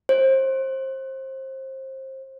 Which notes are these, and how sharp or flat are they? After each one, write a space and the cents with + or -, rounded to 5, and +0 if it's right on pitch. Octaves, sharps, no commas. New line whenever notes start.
C5 +25